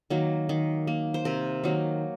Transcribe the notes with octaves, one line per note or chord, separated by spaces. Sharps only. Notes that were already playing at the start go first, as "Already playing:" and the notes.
D#3 F#3 A#3
D#3
A#3
C5
C3 A#4
D#3 F#3 A#3